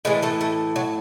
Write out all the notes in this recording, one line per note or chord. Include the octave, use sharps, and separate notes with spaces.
A2 E3 G#3 A3 G#4
A3 A4
A3 A4
F#3 F#4